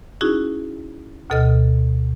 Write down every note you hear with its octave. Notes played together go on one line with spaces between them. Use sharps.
C#4 D#4 E4 F#4 G#4
D2 B2 A4 D#5 F6